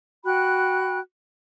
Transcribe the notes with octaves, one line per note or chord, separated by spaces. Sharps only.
F#4 G5 B5 F#6